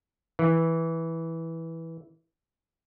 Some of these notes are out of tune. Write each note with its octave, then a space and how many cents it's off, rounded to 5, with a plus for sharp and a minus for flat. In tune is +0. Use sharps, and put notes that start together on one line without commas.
E3 -10